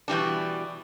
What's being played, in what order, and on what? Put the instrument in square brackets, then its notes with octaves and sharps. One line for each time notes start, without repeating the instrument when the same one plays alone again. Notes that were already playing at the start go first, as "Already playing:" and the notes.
[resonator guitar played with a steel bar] B2 E3 G3 D4